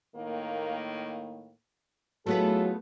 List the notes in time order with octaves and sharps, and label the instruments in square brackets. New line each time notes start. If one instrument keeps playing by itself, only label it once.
[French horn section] A2 D#3 A#3
[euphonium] F#3 [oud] A3 B3 B4 [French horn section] E4 F4 G#4 [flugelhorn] A4